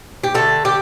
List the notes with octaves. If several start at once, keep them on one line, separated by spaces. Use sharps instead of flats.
G4
D3 A3 A4
G4